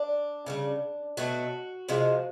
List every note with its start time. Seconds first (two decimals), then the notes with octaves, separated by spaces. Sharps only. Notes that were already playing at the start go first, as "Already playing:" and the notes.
Already playing: D4
0.46 C#3 E3 G3
1.17 B2 F#3 A3 F#4
1.89 C3 F3 G#3